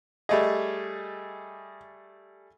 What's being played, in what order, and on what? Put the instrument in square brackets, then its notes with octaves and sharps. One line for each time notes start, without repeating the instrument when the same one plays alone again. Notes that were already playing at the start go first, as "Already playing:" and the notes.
[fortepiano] G3 A3 G#4 [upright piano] D#5